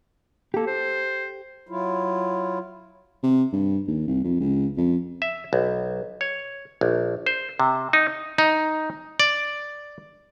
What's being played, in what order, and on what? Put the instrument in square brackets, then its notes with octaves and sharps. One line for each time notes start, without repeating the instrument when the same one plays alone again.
[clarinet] A#3 [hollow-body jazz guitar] G4 A4
[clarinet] C5
[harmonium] F#3 E4 F4
[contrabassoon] C3
G2
D#2
C2
F2
C#2
F2
[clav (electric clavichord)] E5
B1
C#5
A#1
C5
C3
D#4
D#4
D5